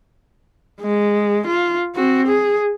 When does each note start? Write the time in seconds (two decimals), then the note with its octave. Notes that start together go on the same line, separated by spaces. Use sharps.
0.82 G#3
1.47 F4
1.95 C4 F#4
2.27 G#4